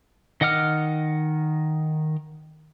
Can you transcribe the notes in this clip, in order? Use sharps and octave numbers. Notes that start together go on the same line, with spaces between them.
D#3 D#5 F#5 D6 F6